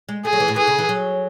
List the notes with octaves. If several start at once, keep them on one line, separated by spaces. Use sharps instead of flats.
G#3
A3 G#4
F#3
E3
A2
E3 G#4
C#3
E3
F#3